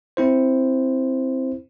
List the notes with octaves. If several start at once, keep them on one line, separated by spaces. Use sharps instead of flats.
C4 E4 C5